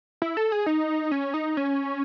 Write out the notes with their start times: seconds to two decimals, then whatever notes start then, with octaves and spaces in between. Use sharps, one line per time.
0.22 E4
0.37 A4
0.52 G#4
0.66 D#4
1.11 C#4
1.34 D#4
1.57 C#4